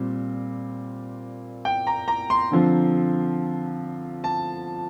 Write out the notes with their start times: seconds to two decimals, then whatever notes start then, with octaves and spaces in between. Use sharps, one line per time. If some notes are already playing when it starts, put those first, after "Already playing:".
Already playing: A#2 G3 C4
1.65 G5
1.87 A#5
2.08 A#5
2.30 C6
2.51 D3 F3 C4
4.24 A5